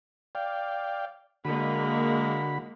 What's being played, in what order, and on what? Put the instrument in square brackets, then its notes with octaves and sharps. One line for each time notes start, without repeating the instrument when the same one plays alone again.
[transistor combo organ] D5 F5 G5
[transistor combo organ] D3 F#4 B5 [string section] G#3 A#3